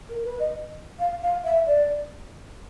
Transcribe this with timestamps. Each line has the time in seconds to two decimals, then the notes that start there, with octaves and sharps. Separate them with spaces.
0.09 A#4
0.25 B4
0.39 D#5
0.99 F5
1.21 F5
1.44 E5
1.66 D5